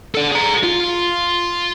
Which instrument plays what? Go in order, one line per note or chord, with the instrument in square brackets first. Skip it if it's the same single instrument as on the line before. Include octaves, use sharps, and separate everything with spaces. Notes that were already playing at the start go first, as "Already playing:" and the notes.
[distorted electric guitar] A4 D5
G#4 A#5
F4